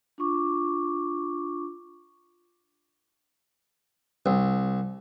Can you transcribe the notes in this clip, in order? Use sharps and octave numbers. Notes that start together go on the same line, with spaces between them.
D4 F4 C#6 D6
C2